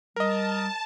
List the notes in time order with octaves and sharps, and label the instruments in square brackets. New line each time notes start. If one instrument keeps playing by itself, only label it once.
[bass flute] G3 [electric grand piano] A#4 D#5 [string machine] A5